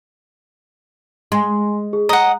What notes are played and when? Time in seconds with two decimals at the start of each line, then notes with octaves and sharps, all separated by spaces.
1.32 G#3 G#5 C6
1.93 G#4
2.09 D#5 F#5 A#5